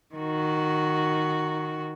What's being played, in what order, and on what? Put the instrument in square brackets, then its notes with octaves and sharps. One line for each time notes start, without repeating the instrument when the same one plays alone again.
[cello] D#3 F#4